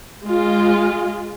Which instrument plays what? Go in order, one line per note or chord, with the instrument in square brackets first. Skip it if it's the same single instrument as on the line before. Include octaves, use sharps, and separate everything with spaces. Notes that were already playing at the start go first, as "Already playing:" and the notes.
[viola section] G#3 F4